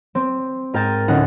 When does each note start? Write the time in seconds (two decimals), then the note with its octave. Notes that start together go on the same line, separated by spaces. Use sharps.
0.15 C4
0.73 G#2 A#4 G5 A6 D#7 E7
1.08 D2 A2 C#4 D#4 F#5